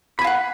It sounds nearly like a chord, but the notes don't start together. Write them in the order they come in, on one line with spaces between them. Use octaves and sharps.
B5 G#5 F5 F#5